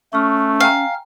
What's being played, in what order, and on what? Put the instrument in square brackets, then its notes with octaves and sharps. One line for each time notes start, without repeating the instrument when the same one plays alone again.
[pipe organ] A3 [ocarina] C#4 [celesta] C#6 F6
[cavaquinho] F5 [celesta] G5 G#5 A#5